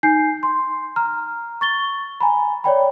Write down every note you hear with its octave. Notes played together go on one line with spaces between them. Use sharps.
D#4 G#5 G6 C7
C6
A#5 F6
C#6 A6 G7
G#5 A#5 B5
C#5 D5 G5 B5